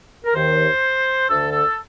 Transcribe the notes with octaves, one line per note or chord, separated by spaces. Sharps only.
A#4
D#2 D#3 C5
D2 D3 A4
A4